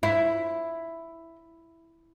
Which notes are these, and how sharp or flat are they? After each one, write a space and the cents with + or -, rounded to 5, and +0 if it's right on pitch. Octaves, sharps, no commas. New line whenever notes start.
E4 +5